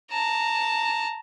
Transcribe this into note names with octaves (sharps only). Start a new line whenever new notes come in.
A5 A#5